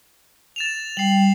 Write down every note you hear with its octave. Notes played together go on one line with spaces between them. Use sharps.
A6 E7 F7
G3 G5 C7 F#7